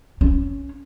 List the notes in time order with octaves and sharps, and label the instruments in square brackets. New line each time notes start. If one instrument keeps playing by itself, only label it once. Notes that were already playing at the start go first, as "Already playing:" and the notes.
[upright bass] C#4